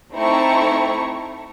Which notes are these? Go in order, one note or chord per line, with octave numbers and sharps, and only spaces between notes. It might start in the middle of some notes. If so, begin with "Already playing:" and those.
A3 C4 D#4 E4 A#5 C#6